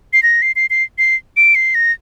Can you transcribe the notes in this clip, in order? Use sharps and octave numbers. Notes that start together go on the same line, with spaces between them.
C7
A#6
C7
C7
C7
C7
D7
C7
A#6